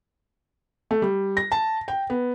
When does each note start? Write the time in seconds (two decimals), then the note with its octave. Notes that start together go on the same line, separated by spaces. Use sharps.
0.91 A3
1.02 G3
1.37 A#6
1.52 A5
1.88 G5
2.10 B3